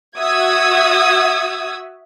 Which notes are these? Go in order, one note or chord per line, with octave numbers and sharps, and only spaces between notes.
F#4 E5 F#5 D#6 E6 G#6